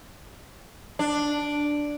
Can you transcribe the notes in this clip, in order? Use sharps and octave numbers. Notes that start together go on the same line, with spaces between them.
D4